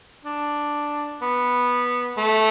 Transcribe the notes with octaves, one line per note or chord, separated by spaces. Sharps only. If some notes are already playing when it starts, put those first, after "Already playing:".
D4
B3
A3